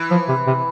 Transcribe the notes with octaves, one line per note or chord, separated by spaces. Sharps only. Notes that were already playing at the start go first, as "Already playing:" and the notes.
Already playing: E3
F3
C3
C3